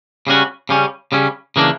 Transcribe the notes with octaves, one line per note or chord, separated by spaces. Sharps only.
C#3 G3 C#4 F#4
C#3 G3 C#4
C#3 G3 C#4
C#3 E3 A#3 D4